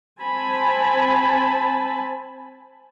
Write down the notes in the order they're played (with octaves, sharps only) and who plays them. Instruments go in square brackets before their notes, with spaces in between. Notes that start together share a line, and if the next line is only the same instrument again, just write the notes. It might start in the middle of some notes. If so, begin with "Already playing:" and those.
[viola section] C4 G#5 A5 B5